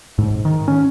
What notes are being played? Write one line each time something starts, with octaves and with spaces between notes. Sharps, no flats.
G#2
D#3
C#4